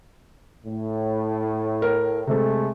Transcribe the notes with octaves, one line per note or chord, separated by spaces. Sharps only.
A2
A#4
C3 G#3 A3 A4